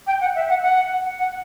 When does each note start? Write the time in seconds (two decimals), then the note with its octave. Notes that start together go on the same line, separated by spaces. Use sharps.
0.07 G5
0.21 F#5
0.35 E5
0.49 F#5
0.63 F#5
1.18 F#5